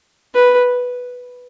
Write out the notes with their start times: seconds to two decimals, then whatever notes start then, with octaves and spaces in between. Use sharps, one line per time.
0.34 B4